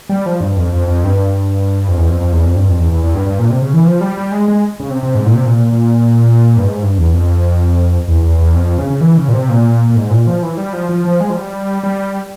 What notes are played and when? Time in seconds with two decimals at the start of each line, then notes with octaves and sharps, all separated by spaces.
0.09 G3
0.26 F3
0.41 G2
0.57 F2
0.72 F2
0.87 F2
1.04 G2
1.88 F2
1.97 E2
2.09 F2
2.21 F2
2.32 E2
2.45 F2
2.56 G2
2.69 F2
2.80 E2
2.92 E2
3.04 E2
3.14 G2
3.26 G2
3.39 A#2
3.50 C3
3.62 C#3
3.74 E3
3.85 F3
4.01 G3
4.17 G3
4.32 G#3
4.48 G#3
4.80 C#3
4.90 C3
5.03 C3
5.15 G#2
5.26 A#2
5.35 C3
5.45 A#2
5.72 A#2
6.57 G2
6.67 G#2
6.82 G2
6.98 E2
7.13 F2
8.08 E2
8.23 E2
8.38 E2
8.55 F2
8.78 C#3
8.90 C#3
9.01 E3
9.17 C#3
9.28 A#2
9.33 C3
9.49 A#2
9.90 A#2
9.96 G#2
10.11 A#2
10.27 F3
10.43 E3
10.57 G3
10.73 F3
10.89 F3
11.05 F3
11.20 G#3
11.30 F3
11.36 G3
11.83 G3